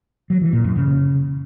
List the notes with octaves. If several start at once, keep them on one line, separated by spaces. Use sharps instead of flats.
F#3
E3
A#2
F#2
C#3